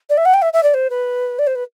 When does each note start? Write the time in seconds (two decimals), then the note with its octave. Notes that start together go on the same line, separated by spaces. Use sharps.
0.10 D5
0.17 E5
0.25 F#5
0.34 G5
0.42 E5
0.53 E5
0.63 D5
0.74 C5
0.90 B4
1.39 D5
1.47 C5
1.55 B4